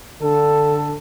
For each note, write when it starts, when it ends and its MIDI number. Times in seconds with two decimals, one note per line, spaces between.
0.21 0.96 50
0.21 0.96 69